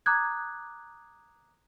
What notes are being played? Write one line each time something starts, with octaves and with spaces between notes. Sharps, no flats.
A#5 D6 D#6 F#6 G#6